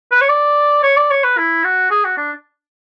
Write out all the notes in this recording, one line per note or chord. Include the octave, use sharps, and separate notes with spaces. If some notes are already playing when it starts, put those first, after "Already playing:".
B4
C#5
D5
C#5
D5
C#5
B4
E4
F#4
G#4
F#4
D4